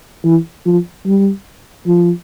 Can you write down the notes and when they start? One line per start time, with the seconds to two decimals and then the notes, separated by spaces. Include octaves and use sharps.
0.24 E3
0.65 F3
1.06 G3
1.87 F3